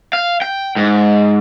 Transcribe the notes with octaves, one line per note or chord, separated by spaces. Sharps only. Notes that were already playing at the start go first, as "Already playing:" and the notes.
F5
G5
G#2